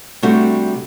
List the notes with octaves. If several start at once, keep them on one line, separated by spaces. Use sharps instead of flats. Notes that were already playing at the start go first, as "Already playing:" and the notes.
C3 G3 A3 D4 F#4